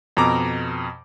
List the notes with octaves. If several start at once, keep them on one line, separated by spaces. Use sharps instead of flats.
F2 B2 A#5 D6